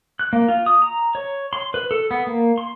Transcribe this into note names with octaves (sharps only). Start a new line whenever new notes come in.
F#6
A#3
F4
D#6
A#5
C#5
C6
B4
A4
B3
A#3
C6